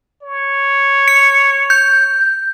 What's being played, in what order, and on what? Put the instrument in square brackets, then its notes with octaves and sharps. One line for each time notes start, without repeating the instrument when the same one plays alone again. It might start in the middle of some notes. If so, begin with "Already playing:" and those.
[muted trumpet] C#5
[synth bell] C#7
G6